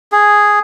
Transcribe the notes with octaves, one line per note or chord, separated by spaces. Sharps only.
G#4